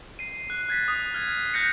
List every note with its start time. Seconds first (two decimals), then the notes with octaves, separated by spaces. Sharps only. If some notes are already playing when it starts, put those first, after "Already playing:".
0.19 C7 D#7
0.50 F#6
0.69 F#6 G#6 A6 B6
0.88 D#6
1.14 F6 G#6 C7
1.54 F#6 G6 A#6 C#7